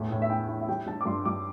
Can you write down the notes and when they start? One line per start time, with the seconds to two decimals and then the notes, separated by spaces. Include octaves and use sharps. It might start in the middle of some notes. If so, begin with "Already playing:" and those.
Already playing: E2 A2
0.11 A2
0.22 E5
0.30 E4 G5
0.48 E4
0.60 E5
0.68 G3 G5
0.86 G3 A5
1.01 D6
1.06 G2 C6
1.26 G2 D6